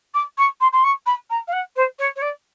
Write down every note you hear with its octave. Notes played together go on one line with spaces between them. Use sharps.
D6
C#6
C6
C6
C#6
B5
A#5
F5
F#5
C5
C#5
C#5
D5